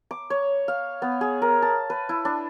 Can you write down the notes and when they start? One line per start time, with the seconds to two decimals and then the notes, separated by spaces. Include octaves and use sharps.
0.11 D6
0.30 C#5
0.68 F5
1.02 B3
1.21 G#4
1.42 A#4
1.62 A5
1.90 B4
2.09 E4
2.25 D4